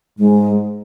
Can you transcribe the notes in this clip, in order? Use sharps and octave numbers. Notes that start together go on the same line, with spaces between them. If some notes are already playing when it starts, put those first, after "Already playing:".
G#2 G#3